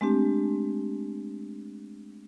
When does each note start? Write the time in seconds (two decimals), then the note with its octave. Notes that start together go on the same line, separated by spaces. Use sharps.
0.01 G#3 A3 C4 D4 G4